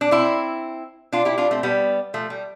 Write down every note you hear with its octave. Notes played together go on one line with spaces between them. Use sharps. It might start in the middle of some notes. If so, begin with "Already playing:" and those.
D4
C4 E4
D4 F4
E4 G4
D4 F4
A3 C4
G3 B3
F3 A3
G3